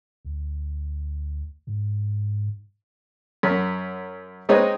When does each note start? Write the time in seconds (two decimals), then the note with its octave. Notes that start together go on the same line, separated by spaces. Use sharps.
0.25 D2
1.67 G#2
3.43 F#2
4.49 G#3 C4 D#4 B4 C#5 D#5